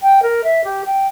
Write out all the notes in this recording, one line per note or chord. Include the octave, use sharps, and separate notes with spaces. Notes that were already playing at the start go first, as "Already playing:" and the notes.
G5
A#4
E5
G4
G5